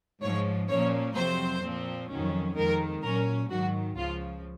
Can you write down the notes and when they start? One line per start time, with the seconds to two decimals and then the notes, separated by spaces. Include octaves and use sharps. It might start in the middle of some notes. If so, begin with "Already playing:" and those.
0.21 G#2 F3 G#3 C#5
0.69 A#2 F3 A#3 C#4 C#5
1.16 F2 C3 F#3 C4 C5
1.63 A#2 F3 C4
2.10 F2 D#3 F#3 C#4
2.55 F2 D#3 G#3 A#4
3.02 A#2 F#3 C#4 A#4
3.49 G#2 D#3 F#3 F#4
3.96 C#2 C#3 F3 F4